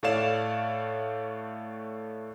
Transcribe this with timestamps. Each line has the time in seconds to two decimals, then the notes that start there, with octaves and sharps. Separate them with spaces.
0.03 A2 A3 C#5 D5 F5 E7